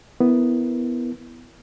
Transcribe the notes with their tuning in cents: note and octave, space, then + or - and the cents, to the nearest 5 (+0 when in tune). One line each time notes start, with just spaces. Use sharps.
B3 +5 E4 +0 A#4 +0